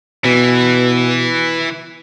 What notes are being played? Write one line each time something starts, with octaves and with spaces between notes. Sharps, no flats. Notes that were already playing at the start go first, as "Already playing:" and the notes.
B2 E3